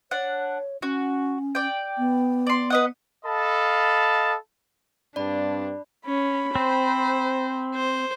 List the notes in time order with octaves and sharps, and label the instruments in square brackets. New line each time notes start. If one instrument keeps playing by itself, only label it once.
[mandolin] D4 F#5 [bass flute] C#5
[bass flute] C#4 [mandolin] F#4
[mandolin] D5 G5
[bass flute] B3
[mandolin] D5 C6
B4 D#5 F#5
[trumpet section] A4 D#5 F5 A5 B5
[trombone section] G2 C4 [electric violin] D4 [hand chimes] D5 B5
[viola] C#4 [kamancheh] B5
[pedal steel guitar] C4 [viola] C5
[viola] C5